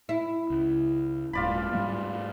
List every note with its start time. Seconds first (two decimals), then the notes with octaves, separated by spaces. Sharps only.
0.09 E4
0.50 C#2
1.33 D#1 G#2 G#3 F4 D5 B5
1.73 G#2 G3 A3